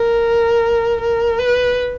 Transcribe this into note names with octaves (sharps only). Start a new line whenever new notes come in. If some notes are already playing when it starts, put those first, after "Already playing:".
Already playing: A#4
A#4
B4